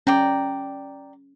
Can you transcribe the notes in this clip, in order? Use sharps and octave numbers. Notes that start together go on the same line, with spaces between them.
C#4 D5 G5 A#5